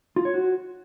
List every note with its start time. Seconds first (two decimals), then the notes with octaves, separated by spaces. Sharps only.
0.16 F4
0.25 C#5
0.34 F#4